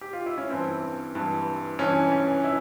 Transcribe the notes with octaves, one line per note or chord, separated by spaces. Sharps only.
G4
F4
E4
C#4
G2 E3 C4
G2 E3
G2 E3 C#4
C#4
E4